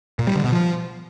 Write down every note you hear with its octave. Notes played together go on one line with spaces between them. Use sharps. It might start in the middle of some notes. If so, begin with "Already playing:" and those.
A#2
G3
D3
B2
F3